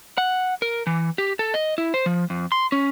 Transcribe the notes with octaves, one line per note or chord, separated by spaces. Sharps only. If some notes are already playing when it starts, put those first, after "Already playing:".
F#5
A#4
E3
G4
A4
D#5
E4
C5
F3
F2
C6
C#4